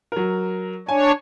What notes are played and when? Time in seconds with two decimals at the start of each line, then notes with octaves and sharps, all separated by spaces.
0.12 F#3 A#4
0.89 D4 C#5 G#5